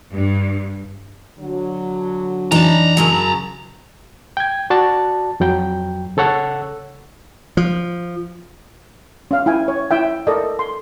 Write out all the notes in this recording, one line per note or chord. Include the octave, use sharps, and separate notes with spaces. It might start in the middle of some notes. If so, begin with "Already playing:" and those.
G2
D3 F#3
F2 E3 D4 D#4 A5 A#5
F#2 C#3 F#3
G5 G#6
F#4 D5 A5
F2 F#3 G5
C#3 A4 C#5 F#5 E6
F3
C#4 F5
E4 G5 G#5
C#5
E4 E5 G5
A4 A#4 D5 D#5
C6